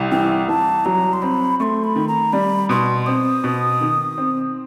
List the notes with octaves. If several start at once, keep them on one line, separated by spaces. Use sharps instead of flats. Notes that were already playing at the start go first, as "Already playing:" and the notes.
Already playing: C2 C3
E3 G5
C2 A5
F#3 A#5
C6
C4 B5
A3 C6 C#6
B5
D#3
A#5
G3 B5
B2 C6
C4 D#6
B2
D#3
C4